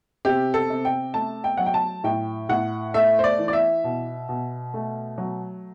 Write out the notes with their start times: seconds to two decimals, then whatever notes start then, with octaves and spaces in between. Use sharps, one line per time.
0.25 C3 G4
0.54 A4
0.70 C3
0.85 G5
1.14 A3 A5
1.44 G5
1.57 F#3 F#5
1.66 G5
1.74 A5
2.04 A2 G5
2.49 A2 F#5
2.94 A3 E5
3.19 C5
3.24 D5
3.39 E3
3.48 D5
3.53 E5
3.84 B2
4.29 B2
4.74 A3
5.18 F#3